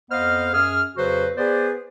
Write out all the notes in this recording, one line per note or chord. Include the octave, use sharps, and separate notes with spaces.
F2 B3 C5 D#5 F5 F6
F#2 G#4 F6
F2 C#3 F#3 F#4 B4 C5
B3 G#4 B4 C5 D5